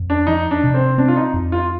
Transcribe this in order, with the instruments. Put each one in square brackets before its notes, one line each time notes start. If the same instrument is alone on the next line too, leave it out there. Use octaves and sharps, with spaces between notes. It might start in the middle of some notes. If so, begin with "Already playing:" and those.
Already playing: [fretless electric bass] F2
[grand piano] D4
[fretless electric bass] F3 [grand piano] D#4
[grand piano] D4
[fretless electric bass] C3
[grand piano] C4
[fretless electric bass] C4 [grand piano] D4
[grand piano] F4
D#4
[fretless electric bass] F2
[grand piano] F4